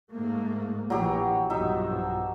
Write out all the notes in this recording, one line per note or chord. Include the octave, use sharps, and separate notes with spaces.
G#2 A3 A#3
A#1 A#2 E3 F#3 G4
B1 G2 F3 D#4 E5